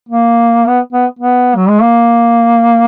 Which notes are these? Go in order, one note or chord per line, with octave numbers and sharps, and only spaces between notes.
A#3
B3
B3
B3
F#3
G#3
A#3